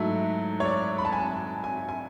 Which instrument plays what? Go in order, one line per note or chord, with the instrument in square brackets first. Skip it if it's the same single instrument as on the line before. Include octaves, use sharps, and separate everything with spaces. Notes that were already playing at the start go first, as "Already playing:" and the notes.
Already playing: [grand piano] G#2 F#3 A3 E4
[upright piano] C#5
D5
B5
A5
G#5
A5
G#5
G#5